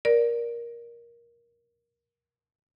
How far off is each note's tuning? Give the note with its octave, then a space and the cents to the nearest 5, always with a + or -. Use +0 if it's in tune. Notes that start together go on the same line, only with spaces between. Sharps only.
A#4 +15 D5 +0